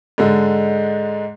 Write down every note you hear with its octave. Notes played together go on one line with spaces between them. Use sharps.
G#2 D3 G#3